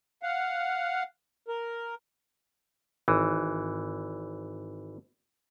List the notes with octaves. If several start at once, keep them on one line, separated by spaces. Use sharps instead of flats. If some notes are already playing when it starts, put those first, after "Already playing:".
F5 F#5
A#4
G#1 E3